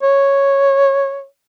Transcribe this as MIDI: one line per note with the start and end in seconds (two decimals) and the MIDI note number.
0.02 1.25 73